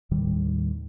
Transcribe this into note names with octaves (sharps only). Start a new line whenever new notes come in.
D#2 A2 D#3 G3